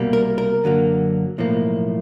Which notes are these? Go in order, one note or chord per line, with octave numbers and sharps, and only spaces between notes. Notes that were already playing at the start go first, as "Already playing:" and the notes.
Already playing: C2 B2 G3 A#3
A#4
A#4
F#2 D3 F#3 A#3
B1 A2 F3 A#3